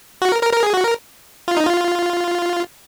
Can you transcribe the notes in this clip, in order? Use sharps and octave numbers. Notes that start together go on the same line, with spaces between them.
F#4
A#4
A#4
A#4
G#4
F#4
A#4
F4
D#4
F4